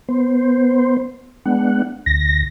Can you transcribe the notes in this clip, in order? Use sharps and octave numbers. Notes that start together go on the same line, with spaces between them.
B3 C5
G#3 B3 D4 F#5
D2 A#6